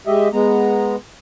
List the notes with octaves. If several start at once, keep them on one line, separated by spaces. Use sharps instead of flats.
G#3 G4 D#5 E5
G#3 B3 A#5